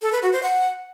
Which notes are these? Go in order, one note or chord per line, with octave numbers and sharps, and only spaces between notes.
A4
B4
F#4
C5
F#5